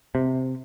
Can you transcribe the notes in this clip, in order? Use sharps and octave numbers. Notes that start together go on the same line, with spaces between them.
C3